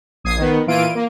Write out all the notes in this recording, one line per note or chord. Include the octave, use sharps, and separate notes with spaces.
A#1 D#6 G#6 C7
D#3 B3
A#2 E3 E4 F4 D7 D#7
A#3